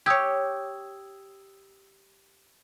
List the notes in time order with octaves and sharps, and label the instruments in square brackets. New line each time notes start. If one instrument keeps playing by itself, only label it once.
[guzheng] G4 C#5 [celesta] D#6 E6 G#6